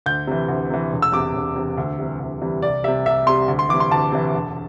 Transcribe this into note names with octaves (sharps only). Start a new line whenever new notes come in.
D2 G6
C3 E3
D2
C3 E3
E1
E6
E2 C3 D6
E1
E2 C3
D2
C3 E3 G3
D2
C3 E3 G3
C2 D5
C3 G3 E5
C2 E5
C3 G3 C6
D2
C6
C3 E3 D6
C6
D2 A5
C3 E3
E1